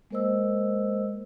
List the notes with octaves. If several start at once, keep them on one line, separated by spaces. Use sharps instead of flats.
G#3 A#3 A#4 C5 D#5 E6